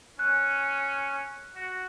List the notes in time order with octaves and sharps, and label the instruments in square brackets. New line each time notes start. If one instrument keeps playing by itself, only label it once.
[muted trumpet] C#4 [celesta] F#6
[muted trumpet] F#4